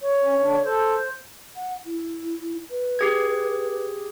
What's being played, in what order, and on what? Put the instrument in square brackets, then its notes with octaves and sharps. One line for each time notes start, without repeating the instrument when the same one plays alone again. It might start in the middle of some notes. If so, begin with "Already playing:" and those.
[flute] C#5
[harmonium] C#4
D3 D4
[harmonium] A4 [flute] C5
[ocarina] F#5
E4
B4
[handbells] G4 G#4 G#6